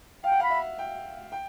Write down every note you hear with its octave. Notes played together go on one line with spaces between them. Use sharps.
F5 G5
F#5
F5 B5
E5
G5
G5